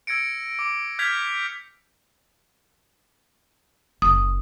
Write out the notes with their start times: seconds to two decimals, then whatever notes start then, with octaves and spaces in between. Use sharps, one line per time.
0.07 E6 G#6 A#6 C#7 D7
0.59 D6
0.99 F6 G6 G#6 B6 F7
4.02 F#1 D#6